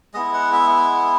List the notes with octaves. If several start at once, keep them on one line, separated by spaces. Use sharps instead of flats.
G#3 B3 E4 D#5
F#5
E5